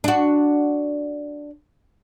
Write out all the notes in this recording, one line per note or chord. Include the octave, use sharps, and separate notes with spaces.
D4 F#4